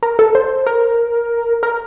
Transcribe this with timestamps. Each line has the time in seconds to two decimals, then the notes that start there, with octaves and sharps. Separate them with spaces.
0.03 A#4
0.19 A4
0.35 C5
0.67 A#4
1.63 A#4